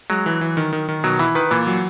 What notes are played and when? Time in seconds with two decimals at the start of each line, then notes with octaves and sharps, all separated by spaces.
0.10 F#3 G#3
0.26 E3
0.41 E3
0.57 D#3
0.73 D#3
0.88 D#3
1.04 B2 F#3
1.19 E3 E4
1.35 D#3 B4
1.51 A#2 E3
1.67 F#3